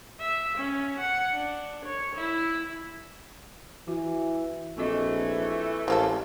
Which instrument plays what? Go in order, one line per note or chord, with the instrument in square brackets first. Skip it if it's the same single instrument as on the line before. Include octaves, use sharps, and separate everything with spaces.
[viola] E5
C#4
F#5
D4
C#5
E4
[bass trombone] E3 [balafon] F#4
[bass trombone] A#1 [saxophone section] E3 A3 [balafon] C4 F#4 D#5
[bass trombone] A1 [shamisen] G#3 A#3 A4 [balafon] C5